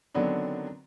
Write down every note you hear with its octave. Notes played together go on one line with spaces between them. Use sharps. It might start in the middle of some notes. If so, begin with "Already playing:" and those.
D3 D#3 F#3 B3 C4 D4